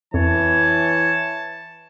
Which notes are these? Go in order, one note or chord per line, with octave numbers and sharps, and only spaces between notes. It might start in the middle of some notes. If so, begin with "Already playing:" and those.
F2 E3 C#5 A5